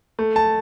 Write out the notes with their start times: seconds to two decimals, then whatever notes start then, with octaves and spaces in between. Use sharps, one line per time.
0.19 A3
0.36 A5